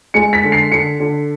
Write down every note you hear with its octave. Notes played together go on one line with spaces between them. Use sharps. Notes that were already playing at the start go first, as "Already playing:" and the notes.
G#3 C#7
B6
D3
C7
D3 C#7
D3